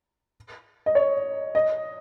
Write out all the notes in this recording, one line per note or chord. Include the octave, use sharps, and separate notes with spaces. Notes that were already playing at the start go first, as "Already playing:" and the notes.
D#5
C#5
D#5